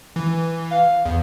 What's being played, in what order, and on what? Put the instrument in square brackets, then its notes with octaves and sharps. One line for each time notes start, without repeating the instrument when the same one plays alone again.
[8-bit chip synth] E3
[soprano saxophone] F5
[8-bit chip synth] E2